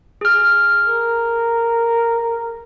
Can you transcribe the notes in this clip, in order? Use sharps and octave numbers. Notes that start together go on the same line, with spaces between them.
G#4 F6
A#4